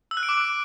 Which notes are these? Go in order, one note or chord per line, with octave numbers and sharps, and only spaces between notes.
E6
F#6
D7
D6